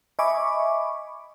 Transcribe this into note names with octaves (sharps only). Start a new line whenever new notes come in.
D#5 E5 G#5 B5 C#6 D6